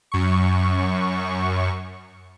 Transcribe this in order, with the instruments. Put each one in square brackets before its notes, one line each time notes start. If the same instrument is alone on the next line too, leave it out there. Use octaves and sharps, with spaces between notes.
[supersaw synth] F#2 C#6